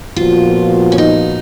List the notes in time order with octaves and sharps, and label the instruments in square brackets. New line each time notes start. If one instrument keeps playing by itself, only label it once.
[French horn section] A#2 F3 B3 F#4 [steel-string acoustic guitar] F4
[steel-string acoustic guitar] C#4
D#4